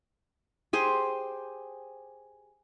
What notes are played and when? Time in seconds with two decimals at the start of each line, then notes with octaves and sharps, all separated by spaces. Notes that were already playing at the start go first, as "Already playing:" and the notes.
0.73 G4 G#4 C5